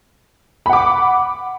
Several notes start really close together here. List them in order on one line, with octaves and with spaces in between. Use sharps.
B5 F#5 D6